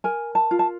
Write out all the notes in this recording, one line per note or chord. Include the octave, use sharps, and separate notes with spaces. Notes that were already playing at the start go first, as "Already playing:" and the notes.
A#4 G#5
A5
F4
A5